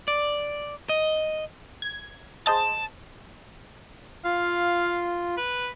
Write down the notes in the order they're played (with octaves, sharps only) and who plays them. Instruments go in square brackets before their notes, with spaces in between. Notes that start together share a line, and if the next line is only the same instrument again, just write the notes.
[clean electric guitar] D5
D#5
[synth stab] G#6
[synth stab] G#4 C5 D#5 [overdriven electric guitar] A5
[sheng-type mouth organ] F4 [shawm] F5
[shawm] B4